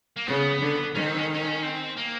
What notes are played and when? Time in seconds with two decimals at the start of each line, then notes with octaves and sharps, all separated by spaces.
0.17 A#3
0.27 C#3 B3
0.60 D3
0.95 D#3 C#4
1.06 C4
1.17 C#4
1.34 C#4
1.63 C4
1.97 A#3